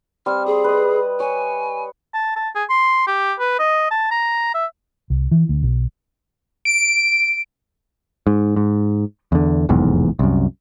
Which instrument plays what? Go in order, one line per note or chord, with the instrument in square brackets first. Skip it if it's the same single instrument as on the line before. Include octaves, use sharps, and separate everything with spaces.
[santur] G3 C4 [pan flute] F6
[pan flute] G#4 [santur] C6 D#6
[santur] B4 D#5
[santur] C#5 [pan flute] G#5
[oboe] A5
A5
G#4
C6
G4
B4
D#5
A5
A#5
E5
[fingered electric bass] C2
E3
D2
B1
[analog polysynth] D7
[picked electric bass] G#2
G#2
E2 D3
F1 B1 E2 G#2
C2 F#2